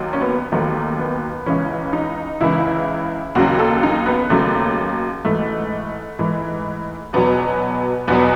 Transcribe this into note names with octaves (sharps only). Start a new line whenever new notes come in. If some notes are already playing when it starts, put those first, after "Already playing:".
Already playing: D#2 D#3 F#3
C#4
B3
D#2 D#3 F#3 A3
B3
C#2 C#3 E3 C#4
D#4
C#2 C#3 E3 E4
D#2 C#3 F#3 F#4
A4
D#4
B3
D#2 C#3 F#3 A3
G#2 E3 A3
G#2 E3
E2 B2 F#3 B3
E2 B2 F#3 B3